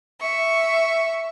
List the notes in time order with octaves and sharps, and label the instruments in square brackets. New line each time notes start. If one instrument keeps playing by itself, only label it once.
[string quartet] E5 C#6